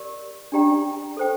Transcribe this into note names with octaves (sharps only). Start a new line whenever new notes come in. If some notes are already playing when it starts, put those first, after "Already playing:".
Already playing: G4 A#4 D5
D4 G4 D5 G5 A#5
A4 C5 G5